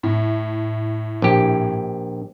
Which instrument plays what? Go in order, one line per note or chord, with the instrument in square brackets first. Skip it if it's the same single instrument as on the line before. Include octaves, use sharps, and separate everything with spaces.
[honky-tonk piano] A2
[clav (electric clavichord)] A#1 G4